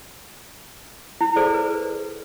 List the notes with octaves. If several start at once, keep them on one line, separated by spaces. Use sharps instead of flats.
E4
G#4 A4 C5 D5
B4